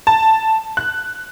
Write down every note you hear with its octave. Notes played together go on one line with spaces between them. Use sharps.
A5
F#6